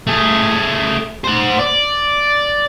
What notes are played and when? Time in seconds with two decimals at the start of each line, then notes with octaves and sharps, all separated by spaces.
0.07 A3 G#4
1.24 C5 F#5
1.59 D5